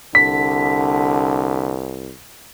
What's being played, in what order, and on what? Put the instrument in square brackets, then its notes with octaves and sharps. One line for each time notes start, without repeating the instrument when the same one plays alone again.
[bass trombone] C2 [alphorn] D3 [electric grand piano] B6